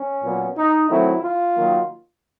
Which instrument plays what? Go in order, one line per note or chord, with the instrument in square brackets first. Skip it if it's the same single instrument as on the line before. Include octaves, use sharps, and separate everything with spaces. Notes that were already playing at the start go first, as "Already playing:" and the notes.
Already playing: [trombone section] C#4
A#2 F#3 B3
D#4
D#3 F#3 A3 C4 E4
F4
D#3 F#3 A#3